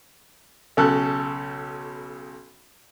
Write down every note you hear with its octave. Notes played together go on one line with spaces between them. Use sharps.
B1 C#3 A4 F#6